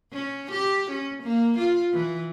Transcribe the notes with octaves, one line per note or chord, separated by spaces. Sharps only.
C#4
G4
C#4
A#3
F4
E3